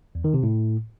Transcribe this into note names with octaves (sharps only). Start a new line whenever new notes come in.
E2
D#3
C3
A2